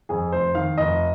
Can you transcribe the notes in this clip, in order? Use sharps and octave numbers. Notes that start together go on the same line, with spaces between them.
F2 G#4
F1 C5
D#3 F5
F1 D#5